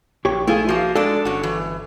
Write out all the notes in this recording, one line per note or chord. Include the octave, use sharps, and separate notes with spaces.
A#1 G4 C#5
A3 E4 F4 G#4
F3 A#3 F#4
G#3 D4 A4 D5
G1 C#4 F#4
E3